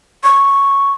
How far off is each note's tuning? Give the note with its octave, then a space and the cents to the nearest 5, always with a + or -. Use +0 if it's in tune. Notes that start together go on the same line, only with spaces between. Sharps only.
C#6 -5